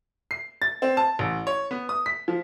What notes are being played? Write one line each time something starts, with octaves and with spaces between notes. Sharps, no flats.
C7
A6
C4
A5
A1
C#5
B3
D#6
B6
F3